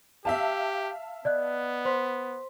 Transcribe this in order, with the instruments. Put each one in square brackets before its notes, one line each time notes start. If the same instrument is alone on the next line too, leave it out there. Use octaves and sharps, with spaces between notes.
[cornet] G4 [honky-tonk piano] E5 F5 A5
[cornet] B3 [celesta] D5 D#5 F#6
[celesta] C5 C6 B6